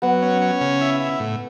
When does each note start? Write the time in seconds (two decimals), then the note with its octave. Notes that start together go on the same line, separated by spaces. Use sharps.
0.02 F#3 B3
0.22 C#4
0.42 C#4
0.61 C#3
0.81 E4
1.00 E4
1.20 A2